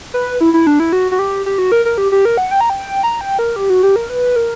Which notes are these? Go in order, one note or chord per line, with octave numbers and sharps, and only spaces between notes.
B4
E4
E4
D4
E4
F#4
F#4
G4
G4
F#4
A#4
A#4
G4
G4
A#4
F#5
G5
A#5
G5
A#5
G5
A#4
G4
F#4
G4
A#4
B4
A#4